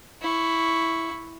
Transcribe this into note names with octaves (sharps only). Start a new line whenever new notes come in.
E4 C#6